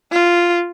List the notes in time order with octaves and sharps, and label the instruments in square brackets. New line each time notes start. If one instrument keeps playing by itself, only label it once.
[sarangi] F4